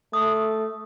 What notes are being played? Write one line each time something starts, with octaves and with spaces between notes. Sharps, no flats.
A3 D#6